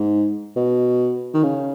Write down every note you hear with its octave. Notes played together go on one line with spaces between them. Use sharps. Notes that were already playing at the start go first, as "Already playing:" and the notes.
Already playing: G#2
B2
D#3
C#3